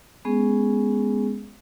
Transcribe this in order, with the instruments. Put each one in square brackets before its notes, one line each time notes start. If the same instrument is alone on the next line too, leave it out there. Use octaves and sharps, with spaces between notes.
[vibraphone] G#3 B3 C#4 G#4